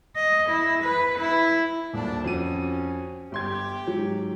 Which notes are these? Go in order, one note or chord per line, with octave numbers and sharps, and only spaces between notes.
D#5
E4
B4
E4
D#1 A#3 D4 A5
F2 C#4 F#4 D#7
G1 G4 C6 G#6
G#2 F#3